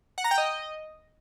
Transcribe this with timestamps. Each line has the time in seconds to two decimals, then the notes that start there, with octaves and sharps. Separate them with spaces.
0.18 F#5
0.24 A#5
0.31 G5
0.38 D#5